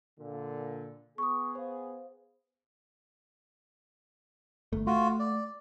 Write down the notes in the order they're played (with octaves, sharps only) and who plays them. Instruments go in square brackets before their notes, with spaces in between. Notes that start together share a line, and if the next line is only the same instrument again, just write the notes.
[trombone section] A#2 D3
[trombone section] B3 G#4 [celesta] C#6 D#6
[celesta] C5 F5
[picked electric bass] G1 A3
[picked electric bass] A3 [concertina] F4 F#4
[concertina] D5